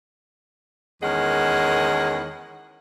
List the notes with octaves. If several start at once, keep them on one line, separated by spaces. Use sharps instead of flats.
E2 D#3 G#3 C#4 A#4 F#5